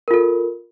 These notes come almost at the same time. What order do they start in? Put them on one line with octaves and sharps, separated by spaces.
A#4 F4 A4